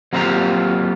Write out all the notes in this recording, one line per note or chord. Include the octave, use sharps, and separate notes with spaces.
F#3 A#3 C4 F4 G4 A#5